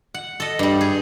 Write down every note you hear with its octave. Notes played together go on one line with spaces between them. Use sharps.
F#5
A4 D#5
G2 G3
G#4